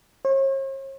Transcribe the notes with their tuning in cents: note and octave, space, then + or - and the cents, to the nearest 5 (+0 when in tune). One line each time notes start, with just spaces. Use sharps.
C#5 -45